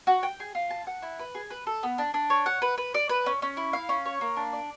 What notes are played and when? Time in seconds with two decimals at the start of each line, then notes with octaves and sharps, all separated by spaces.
0.07 F#4
0.23 G5
0.40 G#4
0.55 F4
0.70 A5
0.87 F#5
1.02 E4
1.19 B4
1.35 G#4
1.50 B4
1.67 A4
1.83 B3
1.98 D4
2.14 D4
2.30 C#5
2.46 F#5
2.62 B4
2.78 B4
2.94 D5
3.09 B4
3.26 C#4
3.42 C#4
3.57 E4
3.73 F5
3.89 C#4
4.06 C#5
4.21 A#3
4.36 D4
4.53 D5